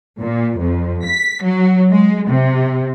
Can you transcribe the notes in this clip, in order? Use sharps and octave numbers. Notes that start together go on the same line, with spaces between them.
A#2
F2
B6
F#3
G#3
C3